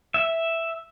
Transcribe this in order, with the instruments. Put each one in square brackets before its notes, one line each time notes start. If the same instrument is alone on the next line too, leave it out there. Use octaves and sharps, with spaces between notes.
[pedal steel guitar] E5